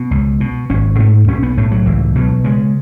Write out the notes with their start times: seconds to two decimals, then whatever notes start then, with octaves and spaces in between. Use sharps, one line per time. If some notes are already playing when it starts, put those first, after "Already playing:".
Already playing: B2 B3
0.11 C#2
0.40 B2
0.70 G#1 C#4
0.99 G#2 A3
1.28 B1 C#4
1.43 B3
1.58 A2 A3
1.71 F#3
1.86 C#2 E3
2.15 B2 F#3
2.44 C#3 G#3